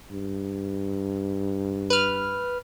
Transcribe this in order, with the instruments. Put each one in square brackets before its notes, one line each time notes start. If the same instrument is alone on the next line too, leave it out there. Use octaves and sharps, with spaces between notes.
[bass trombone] G2
[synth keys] B4 F6